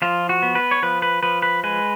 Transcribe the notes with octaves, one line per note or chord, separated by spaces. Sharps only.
F3 F4
F#4
B3
B4
C#5
F3 B4
B4
F3 B4
B4
G#3 B4